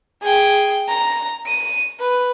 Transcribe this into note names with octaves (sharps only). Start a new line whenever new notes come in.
G#4 G5
A#5
D#7
B4